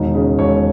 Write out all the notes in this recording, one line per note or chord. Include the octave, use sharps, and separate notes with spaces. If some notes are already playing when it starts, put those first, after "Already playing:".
Already playing: E1 D#3
C#3
E1 C#5